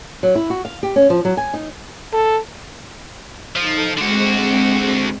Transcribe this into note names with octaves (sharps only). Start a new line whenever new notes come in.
F#3
E4
F#4
F5
G4
C#4
F3
F#3
G#5
D#4
A4
F3 D#4 A4
D3 G#3 C4 F#4